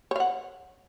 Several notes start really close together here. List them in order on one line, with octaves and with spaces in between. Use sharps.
C#5 F5 F#5